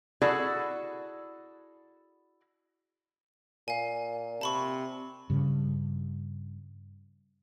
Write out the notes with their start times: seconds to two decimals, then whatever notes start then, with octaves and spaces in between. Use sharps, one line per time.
0.22 E4 F#4 G#4 A4 D5 F#5
3.68 A#2 F5 G#5
4.41 C3 A5 B5 C#6
5.30 G2 C#3